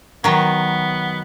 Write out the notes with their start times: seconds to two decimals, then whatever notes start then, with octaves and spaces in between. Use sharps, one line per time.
0.24 D#3 F#3 B3